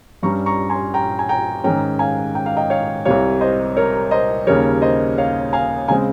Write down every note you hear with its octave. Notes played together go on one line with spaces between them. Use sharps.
G2 G3 C#4 A#5 C#6
A#5 C#6
G#5 C6
G5 A#5
G#5
G5 A#5
G#2 D#3 G#3 C#4 G5 A#5
F5 G#5
G5
F5
D#5 G5
C#5 F5
C2 C3 G3 C#5 F5
C5 D#5
A#4 C#5
C5 D#5
D#2 C#3 G3 A#4 C#5
C5 D#5
C#5 F5
F5 G#5
C#3 G#3 C4 F5 G#5